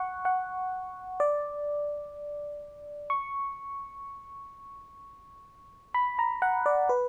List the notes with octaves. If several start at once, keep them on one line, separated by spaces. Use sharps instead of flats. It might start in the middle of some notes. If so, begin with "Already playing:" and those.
Already playing: F#5 C#6
F#5
D5
C#6
B5
A#5
F#5
D5
B4